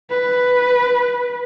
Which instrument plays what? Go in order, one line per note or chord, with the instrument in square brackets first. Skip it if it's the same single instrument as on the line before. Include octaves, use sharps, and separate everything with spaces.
[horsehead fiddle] B4